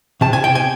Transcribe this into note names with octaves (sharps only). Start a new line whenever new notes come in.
C3 A5
G#5
G5
G#5